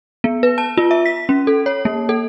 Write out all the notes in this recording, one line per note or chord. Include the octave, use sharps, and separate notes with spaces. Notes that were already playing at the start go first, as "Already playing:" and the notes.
B3
B4
A5
F4
E5
B6
C#4
A4
C#5
A#3
A4